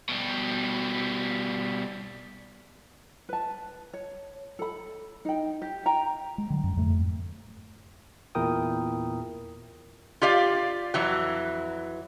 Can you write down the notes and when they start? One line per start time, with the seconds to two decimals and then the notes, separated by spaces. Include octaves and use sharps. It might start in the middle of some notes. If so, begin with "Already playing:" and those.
0.09 B2 G3
3.29 B4 A5
3.93 C#5
4.59 A4 B5
5.25 D#4 G5
5.62 G4
5.86 G5 A#5
6.38 G#3
6.50 D3 F#3
6.64 F#2
6.77 F2 G#2 A3
8.35 E2 A#2 E4 A#4 G5 D#6
10.22 F4 G4 D5 F5
10.94 F2 E3 F#3